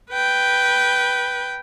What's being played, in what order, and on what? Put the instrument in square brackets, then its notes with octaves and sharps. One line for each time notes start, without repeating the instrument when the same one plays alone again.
[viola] B4 G5